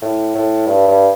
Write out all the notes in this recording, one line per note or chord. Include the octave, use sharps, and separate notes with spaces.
A2
A2
G2
G2